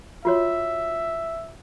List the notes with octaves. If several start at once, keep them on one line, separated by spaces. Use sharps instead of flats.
F4 F#4 C#5 E5